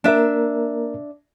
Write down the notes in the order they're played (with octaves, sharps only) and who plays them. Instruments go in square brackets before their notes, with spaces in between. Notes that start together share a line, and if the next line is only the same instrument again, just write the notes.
[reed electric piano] A#3 A#4 [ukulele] D4 E5